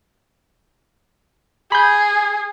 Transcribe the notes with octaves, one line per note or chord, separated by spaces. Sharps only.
G#4 B5 G6